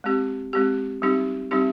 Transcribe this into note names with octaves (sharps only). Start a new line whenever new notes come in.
G#3 C4 G4
G#3 C4 G4
G3 C4 D#4 G4
G3 C4 D#4 G4